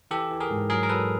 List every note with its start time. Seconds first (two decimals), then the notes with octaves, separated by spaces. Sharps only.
0.11 E3 G4 A4
0.30 E3
0.40 G#4 A#4
0.50 G#2
0.70 F#3 G#4 A#4
0.83 A#4
0.89 F#3 A4 B4